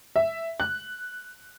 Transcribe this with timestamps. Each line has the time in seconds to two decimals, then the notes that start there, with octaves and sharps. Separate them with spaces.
0.16 E5
0.60 F#6